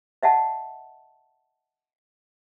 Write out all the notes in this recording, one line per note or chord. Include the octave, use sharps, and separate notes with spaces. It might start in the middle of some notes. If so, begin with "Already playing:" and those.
D#5 E5 F#5 A5